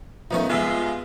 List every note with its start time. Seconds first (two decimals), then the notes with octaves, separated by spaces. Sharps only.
0.31 F2 D#3 A3 B3 C#4 D#4
0.50 C2 G#3 B3 F4 E5